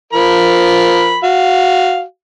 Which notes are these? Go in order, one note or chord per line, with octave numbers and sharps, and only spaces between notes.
F3 A#4 B5
F#4 F5